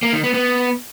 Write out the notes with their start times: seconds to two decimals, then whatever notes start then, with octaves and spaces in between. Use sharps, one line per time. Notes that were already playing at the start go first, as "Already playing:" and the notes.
0.03 A#3
0.13 D#3
0.23 B3
0.34 B3